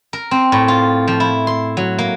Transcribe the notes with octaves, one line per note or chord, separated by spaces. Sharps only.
A#4
C4
A2
F4
F3
E4
C6
F#3
A#3